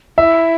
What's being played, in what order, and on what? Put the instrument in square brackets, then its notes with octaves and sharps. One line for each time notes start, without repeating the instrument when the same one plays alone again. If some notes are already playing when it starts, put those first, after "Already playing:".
[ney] E4 [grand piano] E5